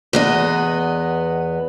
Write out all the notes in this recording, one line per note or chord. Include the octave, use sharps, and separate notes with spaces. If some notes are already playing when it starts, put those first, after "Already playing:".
E2 B3 D#5